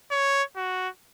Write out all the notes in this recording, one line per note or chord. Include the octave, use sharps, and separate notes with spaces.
C#5
F#4